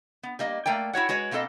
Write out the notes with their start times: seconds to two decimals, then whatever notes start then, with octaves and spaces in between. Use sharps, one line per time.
0.23 B3
0.39 G3 A#3 D#5
0.66 A3 A#3 D5 G5
0.93 E4 F#4 C#5 F#5
1.09 G#3 F#4 B4 C#5
1.31 B2 A#3 C4 A4 D#5